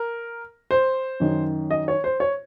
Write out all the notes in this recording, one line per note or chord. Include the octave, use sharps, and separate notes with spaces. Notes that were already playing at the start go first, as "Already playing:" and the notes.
Already playing: A#4
C5
F#2 D#3
D#5
C#5
C5
C#5